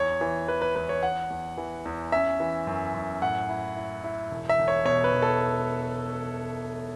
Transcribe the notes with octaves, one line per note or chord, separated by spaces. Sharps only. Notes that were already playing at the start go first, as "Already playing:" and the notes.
Already playing: E2 C#5
E3
E3 B4
B4
E2 B4
C#5
E2 F#5
E2
E3
E2
C#4 E5
E3
F#2
F#2
A2 F#5
E4
E4
E4
E1
E5
E1
C#5
B2 C#5
B4
E1
A4